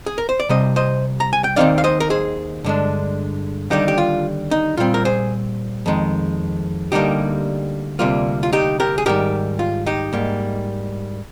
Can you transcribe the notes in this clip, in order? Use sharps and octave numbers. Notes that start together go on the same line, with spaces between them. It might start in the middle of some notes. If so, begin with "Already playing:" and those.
G#4
A#4
C5
D5
C2 C3 G3 C5 D#5
C5 D#5
A#5
G#5
G5
D#2 D#3 G#3 C4 D#4 D5 F5
F5
C5 D#5
A#4
G#4 C5
G2 D3 G#3 D4
D#2 D3 G3 D#4 G4
G4
F4
D#4
A#2 G3 C4 F4
A#4
G#4 C5
F2 D#3 G#3
D2 D3 G3 A#3 D#4 G4
D2 C3 G3 A#3 F4
F4
D#4 G4
G4 A#4
G#4
G#2 D#3 G3 G4 A#4
F4
D#4 G4
G#2 G3 A#3